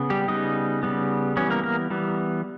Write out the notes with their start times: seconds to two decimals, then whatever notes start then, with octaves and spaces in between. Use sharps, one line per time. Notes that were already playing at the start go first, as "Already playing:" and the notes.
Already playing: C#3 B3
0.10 G3 G4
0.28 C#3 G3 B3 D#4 D#5
0.83 C#3 G3 B3
1.36 E3 G3 B3 C#4 C#5
1.50 A#3 A#4
1.63 A#3 A#4
1.90 E3 G3 B3